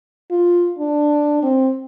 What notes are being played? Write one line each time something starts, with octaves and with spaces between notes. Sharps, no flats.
F4
D4
C4